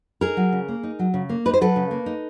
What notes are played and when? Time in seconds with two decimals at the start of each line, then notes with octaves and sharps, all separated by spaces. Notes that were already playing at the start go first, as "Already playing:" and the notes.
0.21 D#4 G#4 A#4
0.37 F#3
0.53 C#3
0.68 A#3
0.83 D#4
0.99 F#3
1.14 C#3
1.29 A#3
1.45 D#4 B4
1.54 C5
1.61 F#3 A4 B4
1.76 C#3
1.91 A#3
2.06 D#4